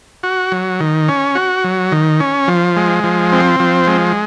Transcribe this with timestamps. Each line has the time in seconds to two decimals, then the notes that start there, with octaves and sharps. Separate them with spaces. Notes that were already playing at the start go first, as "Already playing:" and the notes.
0.23 F#4
0.52 F#3
0.80 D#3
1.08 C#4
1.35 F#4
1.64 F#3
1.92 D#3
2.20 C#4
2.48 F3
2.76 G#3
3.04 F3
3.33 C4
3.60 F3
3.87 G#3